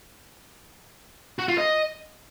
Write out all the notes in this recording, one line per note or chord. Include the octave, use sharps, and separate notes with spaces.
F#4
F4
D#5